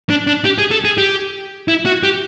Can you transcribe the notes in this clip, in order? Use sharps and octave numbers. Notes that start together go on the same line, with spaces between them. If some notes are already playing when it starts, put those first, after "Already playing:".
D4
D4
G4
G#4
A4
G#4
G4
E4
F#4
G4